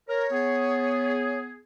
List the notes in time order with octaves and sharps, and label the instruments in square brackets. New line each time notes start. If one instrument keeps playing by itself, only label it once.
[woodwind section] A#4 [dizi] C#5
[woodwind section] B3 G#4